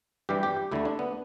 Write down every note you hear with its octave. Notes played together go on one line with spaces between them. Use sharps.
G2 E3 G3 G4
G4
D2 D3 A3 E4
D4
B3